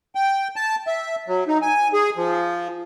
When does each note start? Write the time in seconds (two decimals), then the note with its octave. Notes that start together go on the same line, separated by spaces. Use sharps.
0.15 G5
0.56 A5
0.87 E5
1.28 F#3
1.48 D#4
1.62 G#5
1.93 G#4
2.17 F3